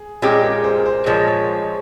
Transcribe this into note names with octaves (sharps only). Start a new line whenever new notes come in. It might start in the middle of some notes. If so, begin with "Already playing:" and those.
Already playing: G#4
A#2 G#3 C#4 G4 G#4
A#4
C5
A#4
C5
A#2 F3 G#3 C#5
C#5
C5